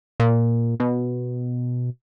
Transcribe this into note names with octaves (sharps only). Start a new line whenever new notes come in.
A#2
B2